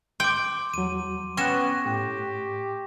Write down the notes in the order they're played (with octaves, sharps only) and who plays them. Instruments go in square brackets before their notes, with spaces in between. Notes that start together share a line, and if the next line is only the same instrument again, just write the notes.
[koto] G5 [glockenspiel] C6 D6
[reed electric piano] E2 F#3 [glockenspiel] D#7
[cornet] B3 [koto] C#4 [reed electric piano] G5 F#6 [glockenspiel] C#6 A#6 E7
[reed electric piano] A2 [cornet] G4